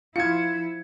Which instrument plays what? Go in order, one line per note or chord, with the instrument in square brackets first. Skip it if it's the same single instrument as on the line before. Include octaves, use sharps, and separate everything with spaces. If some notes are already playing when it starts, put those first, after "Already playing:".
[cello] F3 E4 [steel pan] F4 [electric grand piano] G#6 C#7